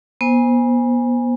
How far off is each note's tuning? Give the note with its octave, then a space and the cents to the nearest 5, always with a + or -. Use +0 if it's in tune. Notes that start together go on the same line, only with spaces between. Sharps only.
B3 -35 C5 +0 G#5 -15